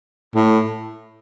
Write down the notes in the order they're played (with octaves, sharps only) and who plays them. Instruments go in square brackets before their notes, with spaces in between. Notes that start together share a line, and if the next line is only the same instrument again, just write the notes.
[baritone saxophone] A2